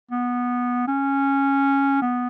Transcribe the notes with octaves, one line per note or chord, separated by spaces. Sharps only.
B3
C#4
B3